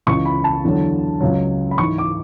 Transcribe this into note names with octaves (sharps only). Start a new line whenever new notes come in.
C#2 C#3 E3 C#6
B5
A5
E2 D3 F#3
C#2 C#3 F#3
B5
G#2 E3 C#6
D6